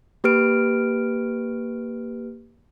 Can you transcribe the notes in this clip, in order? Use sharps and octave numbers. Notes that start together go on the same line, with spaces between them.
A#3 G4 B4 F6 D7